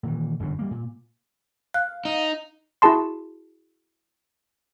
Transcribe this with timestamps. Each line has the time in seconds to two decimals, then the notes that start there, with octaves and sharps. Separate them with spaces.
0.03 A#2 D#3 E3
0.40 G1 F#2 B2 D3
0.59 G3 A#3
0.71 A#2
1.74 F5 F#6
2.05 D#4
2.82 E4 F#4 G#4 A5 C6